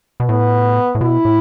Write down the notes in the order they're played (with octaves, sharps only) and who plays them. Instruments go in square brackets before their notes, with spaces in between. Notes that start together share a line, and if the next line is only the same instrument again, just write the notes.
[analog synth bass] B2
[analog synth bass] A2 [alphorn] B3
[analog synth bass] A2
[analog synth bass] B2 [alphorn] E4
[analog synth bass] A2